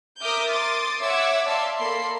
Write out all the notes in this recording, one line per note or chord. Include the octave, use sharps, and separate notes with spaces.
A#4 E5 D6 D#6 F6 G6
C6 D6 D#6 A6
C#5 E5 F#5 D6 E6 G#6
D5 E5 F5 A5 C6 E6
A#3 A4 A#4 B5 C6 C7